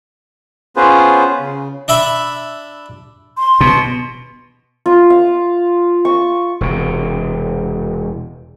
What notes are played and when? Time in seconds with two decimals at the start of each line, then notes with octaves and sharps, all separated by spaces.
0.76 B3 C#4 F4 G#4 B4 C5
1.40 C#3
1.88 D4 E5 B5
3.37 C6
3.61 B2
4.86 F4
5.10 F5
6.05 C#6
6.61 E1 C3